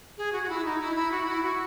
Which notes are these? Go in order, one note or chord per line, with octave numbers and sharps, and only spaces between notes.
G#4
F#4
F#4
E4
D#4
E4
E4
F#4
E4
F#4